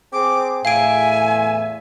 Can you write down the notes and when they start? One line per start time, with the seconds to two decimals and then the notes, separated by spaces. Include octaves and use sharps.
0.13 C4 G#4 D6
0.65 E2 A2 E5 F5 G#5 D7